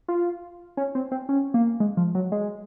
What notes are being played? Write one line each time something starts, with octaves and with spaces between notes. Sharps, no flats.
F4
C#4
C4
C4
C#4
A#3
G#3
F3
F#3
G#3